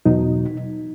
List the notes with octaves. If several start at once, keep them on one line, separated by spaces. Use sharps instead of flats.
E2 B2 F#3 D#4